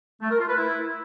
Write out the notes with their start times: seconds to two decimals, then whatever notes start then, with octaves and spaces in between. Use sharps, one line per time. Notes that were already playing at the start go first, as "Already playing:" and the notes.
0.22 A3
0.31 A#4
0.39 F4
0.48 B4
0.57 E4